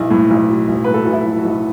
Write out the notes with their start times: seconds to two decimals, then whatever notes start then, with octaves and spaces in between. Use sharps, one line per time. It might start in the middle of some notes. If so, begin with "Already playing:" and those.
Already playing: B1 E4
0.11 A2
0.30 B1
0.49 F#3
0.68 B1
0.84 A2 B4
0.94 A4
1.03 B1 F#4
1.13 E4
1.26 F#3
1.38 F#4
1.44 B1